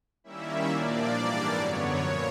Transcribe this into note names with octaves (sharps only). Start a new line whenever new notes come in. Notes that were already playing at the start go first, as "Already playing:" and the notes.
D#3 G3 A#3 C#4 E4 E5
A#2 F3 A#3 D4 D5
G#2 E3 G3 A#3 D4
F#2 D3 F#3 B3 C#5
A#2 F3 A#3 C#5